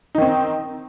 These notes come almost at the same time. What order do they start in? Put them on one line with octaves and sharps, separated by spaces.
D#4 D#3 C4